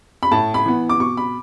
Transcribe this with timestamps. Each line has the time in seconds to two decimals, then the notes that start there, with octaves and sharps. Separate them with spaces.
0.23 B5
0.32 A2 A5
0.54 B5
0.66 E3 B3
0.89 D6
1.00 B2 C#6
1.17 B5